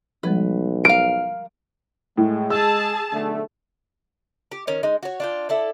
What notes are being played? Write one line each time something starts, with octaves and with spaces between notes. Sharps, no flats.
B1 F3 G3 G#3 B4
A#4 F5 D7
A2 G#3
G#4 A5 E6
B1 D3 A3
G4
D#3 C#4
G#3 D#4
F#4 C#5
D4 F4 G5
E4 A4 D5